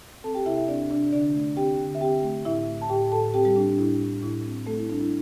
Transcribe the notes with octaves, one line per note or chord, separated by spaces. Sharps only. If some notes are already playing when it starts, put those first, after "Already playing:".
C4 A4 A5
G4 G5
C3 E4 E5
E4 E5
C4 D4 D5
C3 D4 D5
D3 D4 D5
A3
C4 G4 G5
D3
E5
C4 G4 G5
A3
A2 E4 E5
A3
A5
A2 G4 G5
A2 A4 A5
C4 G4 G5
G3 G4
A2 D4
D4
A2 E4
A2
A2 E4
C4
A3 C4 A4
E4
G3 D4
E4